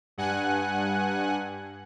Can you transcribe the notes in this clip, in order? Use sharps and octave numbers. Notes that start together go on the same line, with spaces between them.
G2 F#5 G#5 F#6